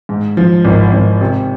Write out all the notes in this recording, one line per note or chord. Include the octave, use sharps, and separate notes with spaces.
G#2
F3
G#1
G#1
C3